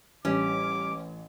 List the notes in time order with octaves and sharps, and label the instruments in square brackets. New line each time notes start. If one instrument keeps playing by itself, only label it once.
[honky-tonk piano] A1 [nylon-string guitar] G3 [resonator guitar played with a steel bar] C#4 [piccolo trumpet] D6